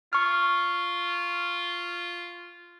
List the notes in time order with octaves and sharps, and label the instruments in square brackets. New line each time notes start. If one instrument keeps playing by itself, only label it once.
[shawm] F4 [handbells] C#6 F6